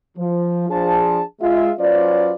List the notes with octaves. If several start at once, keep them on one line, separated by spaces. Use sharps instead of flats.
F3
F3 D4 G#4 A5
G#3 F4 E5
F#3 C#4 F4 B4 C5 D5